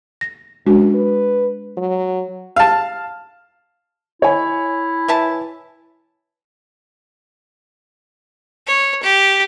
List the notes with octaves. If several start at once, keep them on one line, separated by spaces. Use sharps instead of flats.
A#6
F#2 G#3 D4 F#4
B4
F#3
F5 A5
E4 C#5 G#5
E3 E5 A5
C#5
G4